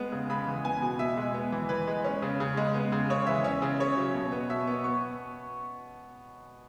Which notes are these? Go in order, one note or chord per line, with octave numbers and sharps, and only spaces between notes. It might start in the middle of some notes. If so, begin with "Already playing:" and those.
Already playing: G#3 B3
C#3
C#3 B5
E3
B3 G#5
B2
B2 E5
G#3
B3
E3
E3 B4
G#3
C#4
C#3
C#3
G#3
B3
C#3
C#3 C#5
E3 E5
C#4
C#3
C#3 C#5
F#3
B2
B3
B2 E5
B3
B3 C#6